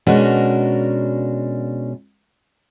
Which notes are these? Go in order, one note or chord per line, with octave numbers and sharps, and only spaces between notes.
B2 G#3 C#4 D4 F#4 A#4